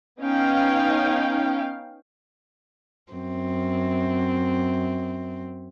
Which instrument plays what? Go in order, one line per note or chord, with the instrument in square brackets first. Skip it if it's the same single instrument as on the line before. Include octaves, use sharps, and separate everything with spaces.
[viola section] B3 C#4 D#4 F5 G5
[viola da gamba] F#2 C4